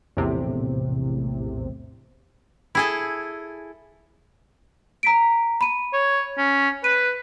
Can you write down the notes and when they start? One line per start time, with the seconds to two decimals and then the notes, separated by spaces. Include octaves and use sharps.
0.17 A#1 E2 A2 C3
2.75 E4 G#4 A4
5.03 A#5 B6 D7
5.61 B5 D#7
5.93 C#5
6.38 C#4
6.84 B4 D#7